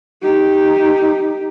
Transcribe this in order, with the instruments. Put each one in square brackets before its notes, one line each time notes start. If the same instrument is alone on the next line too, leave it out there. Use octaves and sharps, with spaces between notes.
[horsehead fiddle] D#4 G4